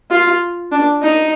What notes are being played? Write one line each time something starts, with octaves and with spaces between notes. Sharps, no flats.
F4
D4
D#4